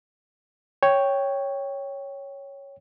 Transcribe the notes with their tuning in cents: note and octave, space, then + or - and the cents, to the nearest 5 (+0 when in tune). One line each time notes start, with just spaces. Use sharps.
C#5 +0 G5 +0